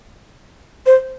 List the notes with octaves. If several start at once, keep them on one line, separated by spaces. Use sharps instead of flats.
C5